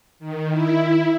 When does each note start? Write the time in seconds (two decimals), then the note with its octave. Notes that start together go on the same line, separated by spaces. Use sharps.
0.19 D#3
0.52 E4